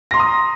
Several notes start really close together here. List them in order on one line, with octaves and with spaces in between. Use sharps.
A#6 C6 A#5 D#6